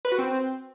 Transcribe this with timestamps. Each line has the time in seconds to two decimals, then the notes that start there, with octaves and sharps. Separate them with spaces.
0.05 B4
0.12 F#4
0.19 C4